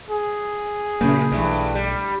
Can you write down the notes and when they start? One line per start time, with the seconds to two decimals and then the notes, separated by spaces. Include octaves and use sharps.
0.10 G#4
1.01 F#2 A#2 C#3 A#3
1.32 B1 G2 E3 A3
1.75 G3